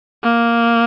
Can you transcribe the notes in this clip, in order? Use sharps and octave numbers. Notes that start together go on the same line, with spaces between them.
A#3